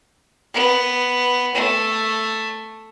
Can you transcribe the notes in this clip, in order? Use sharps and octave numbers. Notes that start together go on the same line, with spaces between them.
B3
A3